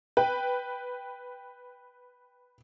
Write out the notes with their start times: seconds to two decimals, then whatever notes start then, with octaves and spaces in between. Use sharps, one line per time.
0.17 B4 G5